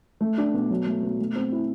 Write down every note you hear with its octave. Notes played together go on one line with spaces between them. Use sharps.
A3
D4
B2
F#3
A3
B2
A3
C4
E4